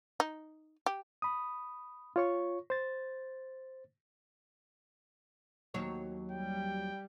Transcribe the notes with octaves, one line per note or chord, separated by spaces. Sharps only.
D#4
G4
B5 D#6
F4 C#5 C#6
C5 A6
D#2 F#3 C#5
G3 G5